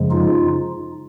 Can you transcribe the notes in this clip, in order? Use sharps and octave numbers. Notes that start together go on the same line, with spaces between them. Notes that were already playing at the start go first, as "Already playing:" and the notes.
Already playing: F#2 C#3 F3 G#3
D#4 F4